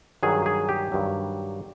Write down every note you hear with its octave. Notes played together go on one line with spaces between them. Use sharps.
G2 D#3 F#3 G#4
G#4
G4
G2 D#3 F#3